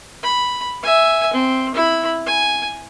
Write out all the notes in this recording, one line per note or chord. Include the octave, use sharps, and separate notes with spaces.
B5
E5 G#5
C4
E4 B5
G#5